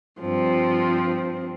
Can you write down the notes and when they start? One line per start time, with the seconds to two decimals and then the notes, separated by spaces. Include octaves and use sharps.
0.20 G2 F3 C4